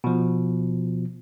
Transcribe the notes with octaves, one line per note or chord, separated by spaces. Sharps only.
B2 F3